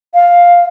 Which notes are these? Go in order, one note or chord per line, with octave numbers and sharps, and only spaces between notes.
F5